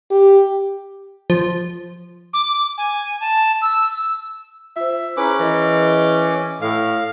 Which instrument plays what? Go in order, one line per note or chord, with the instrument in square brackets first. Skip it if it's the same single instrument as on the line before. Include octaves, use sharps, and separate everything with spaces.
[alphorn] G4
[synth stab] F3
[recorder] D6
G#5
A5
E6
[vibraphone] F4 C5 [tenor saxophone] E5
[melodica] C#4 D6 [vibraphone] E4 G#4 A#5 [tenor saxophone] B4
[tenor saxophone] E3 [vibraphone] G#4 A#4 D#5
[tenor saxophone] A2 [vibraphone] A4 C#6 [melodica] F5